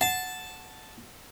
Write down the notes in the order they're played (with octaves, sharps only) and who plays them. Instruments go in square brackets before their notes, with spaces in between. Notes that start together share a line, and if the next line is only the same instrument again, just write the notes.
[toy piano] F#5 [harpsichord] A5